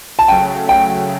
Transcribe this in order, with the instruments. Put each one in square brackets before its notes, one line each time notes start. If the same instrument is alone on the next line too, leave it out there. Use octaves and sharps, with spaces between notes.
[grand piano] A5
[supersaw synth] C#3 F#3 A3 [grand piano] G5
[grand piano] G5